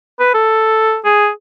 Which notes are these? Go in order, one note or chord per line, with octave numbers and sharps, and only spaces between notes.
B4
A4
G#4